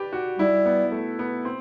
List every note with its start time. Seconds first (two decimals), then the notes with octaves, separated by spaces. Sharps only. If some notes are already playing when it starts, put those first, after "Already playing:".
Already playing: G4 B4 D5
0.13 F#4
0.38 G3 E4
0.65 B3
0.92 A3
1.19 B3
1.45 C4